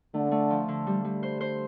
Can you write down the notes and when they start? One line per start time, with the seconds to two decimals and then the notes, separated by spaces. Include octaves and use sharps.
0.14 D3 A3
0.32 A3
0.50 F3
0.68 D3
0.87 G3
1.05 G3
1.23 C5
1.41 C5